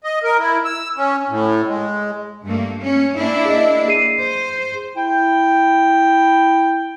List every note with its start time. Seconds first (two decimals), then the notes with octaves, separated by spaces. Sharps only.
0.04 D#5
0.24 A#4
0.38 E4
0.65 E6
0.96 C#4
1.29 A2
1.67 G#3
2.46 G2 A3 A#3
2.82 C#4
3.16 A#3 D4 E4
3.45 G#4 D#5
3.88 G#4 C7 D#7
4.20 C5
4.97 E4 G5